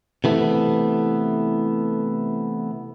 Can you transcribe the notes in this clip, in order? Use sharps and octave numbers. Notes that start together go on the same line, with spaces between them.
C3 E3 A3 B3